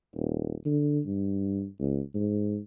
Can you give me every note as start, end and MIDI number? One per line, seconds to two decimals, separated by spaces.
0.15 0.55 27
0.65 1.00 50
1.06 1.66 43
1.79 2.02 37
2.14 2.58 44